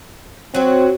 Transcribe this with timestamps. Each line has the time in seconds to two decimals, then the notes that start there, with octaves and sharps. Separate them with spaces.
0.54 F#3 C4 F#4